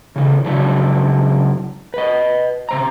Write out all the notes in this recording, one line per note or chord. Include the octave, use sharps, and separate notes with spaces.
C#3 E3
C#3 F#3 G#3 D4 E4 F#4
B4 D#5
C3 C5 A#5